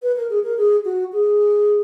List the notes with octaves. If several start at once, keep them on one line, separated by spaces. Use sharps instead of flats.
B4
A#4
G#4
A#4
G#4
F#4
G#4